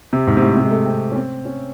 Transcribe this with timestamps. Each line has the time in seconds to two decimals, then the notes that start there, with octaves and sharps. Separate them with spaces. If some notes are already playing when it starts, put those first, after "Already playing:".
0.13 C3
0.27 G#2
0.37 C3
0.42 A2
0.57 C3
0.65 G#3
0.71 A3
0.86 C4
1.12 C#4
1.16 C4
1.45 C#4